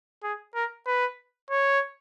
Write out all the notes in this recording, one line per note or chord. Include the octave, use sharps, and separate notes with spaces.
G#4
A#4
B4
C#5